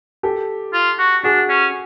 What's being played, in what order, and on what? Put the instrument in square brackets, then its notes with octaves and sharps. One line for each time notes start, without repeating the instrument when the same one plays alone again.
[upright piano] G4 A4
[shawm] F4
F#4
[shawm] D4 [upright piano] F#4 G#4
[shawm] C#4